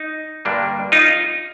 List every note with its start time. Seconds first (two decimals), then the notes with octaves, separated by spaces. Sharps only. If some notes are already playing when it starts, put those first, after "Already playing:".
Already playing: D#4
0.45 G2 D3 G3 A#3 D4
0.92 D#4 F4